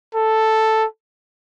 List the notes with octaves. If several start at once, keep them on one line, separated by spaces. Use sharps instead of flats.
A4